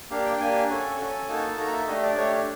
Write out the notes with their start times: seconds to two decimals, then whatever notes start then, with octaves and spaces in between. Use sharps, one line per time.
0.10 A#3 D4 G4 F5
0.26 G5
0.40 A#3 D4 G4 G#5
0.69 C#4 F#4 A4
0.99 C#4 F#4 A4
1.28 A#3 D#4 F#4 A4 A5
1.57 A#3 D#4 F#4 A4 A#5
1.73 E5
1.87 A3 D4 G4 D#5
2.02 D5
2.17 A3 D4 G4 C#5